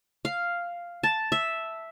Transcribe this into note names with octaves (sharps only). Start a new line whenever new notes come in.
F5
A5
E5